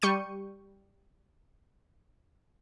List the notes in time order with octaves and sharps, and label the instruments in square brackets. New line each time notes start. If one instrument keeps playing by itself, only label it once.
[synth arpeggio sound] G3 C#6 G6 C#7 D#7